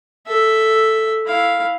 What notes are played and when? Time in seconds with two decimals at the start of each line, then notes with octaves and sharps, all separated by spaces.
0.26 A4 E5
1.26 E4 F5